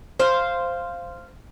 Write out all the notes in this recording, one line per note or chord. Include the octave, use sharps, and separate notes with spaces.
C5 F5